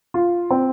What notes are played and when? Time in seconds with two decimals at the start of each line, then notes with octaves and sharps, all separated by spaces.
0.14 F4
0.50 C4